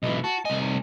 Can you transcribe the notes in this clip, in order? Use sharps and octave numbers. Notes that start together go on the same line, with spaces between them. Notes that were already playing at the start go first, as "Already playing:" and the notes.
B1 E3 D#5
F#4 A5
C2 D#5 G#5
D#4